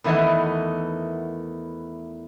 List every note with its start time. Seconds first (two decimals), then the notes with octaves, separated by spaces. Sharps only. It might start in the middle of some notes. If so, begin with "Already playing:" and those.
0.04 E2 D#3 E3 A3 B3 D#5